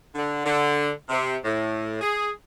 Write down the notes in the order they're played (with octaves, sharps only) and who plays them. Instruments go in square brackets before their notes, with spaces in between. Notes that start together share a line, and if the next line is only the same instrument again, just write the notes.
[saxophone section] D3
D3
C3
A2
G#4